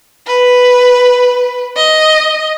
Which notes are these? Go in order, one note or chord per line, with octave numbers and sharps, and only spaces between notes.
B4
D#5